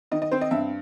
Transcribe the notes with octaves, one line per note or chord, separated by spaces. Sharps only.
D#3 D#5
D#5
C4 C5
D#5
G2 E5